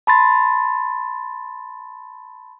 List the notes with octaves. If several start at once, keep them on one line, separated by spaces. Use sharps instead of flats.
A5 B5 C6 A6